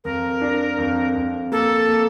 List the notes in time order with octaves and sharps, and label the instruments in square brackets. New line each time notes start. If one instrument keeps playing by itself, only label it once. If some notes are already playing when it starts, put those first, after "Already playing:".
[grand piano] F2 [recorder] A#4
[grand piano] D4
F2
F2
[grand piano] A#3 [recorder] A4
[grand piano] A#3